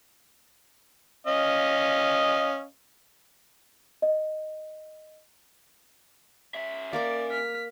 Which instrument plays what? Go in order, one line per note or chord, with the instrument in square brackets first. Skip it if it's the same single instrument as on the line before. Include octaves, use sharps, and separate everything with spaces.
[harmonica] C#4 D#5 F5
[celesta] D#5
[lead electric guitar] C#4 E5
[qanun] A#3 A#4 D6 [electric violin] D5
[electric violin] F6 B6